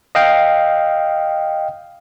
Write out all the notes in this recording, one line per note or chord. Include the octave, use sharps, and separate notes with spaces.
D#5 F5 G5